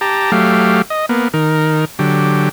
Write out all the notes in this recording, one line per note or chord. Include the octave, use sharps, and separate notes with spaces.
G4 A5 A#5
F#3 A3 G4 F5
D#5
A#3 B3
D#3 A#4
D3 F#3 G4